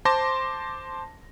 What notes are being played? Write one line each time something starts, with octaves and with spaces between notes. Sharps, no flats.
C5 A5 C6 D6 A#6